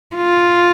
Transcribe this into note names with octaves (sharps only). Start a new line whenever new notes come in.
F4